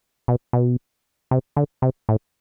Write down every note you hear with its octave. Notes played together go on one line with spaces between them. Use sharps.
B2
B2
C3
D3
C3
A2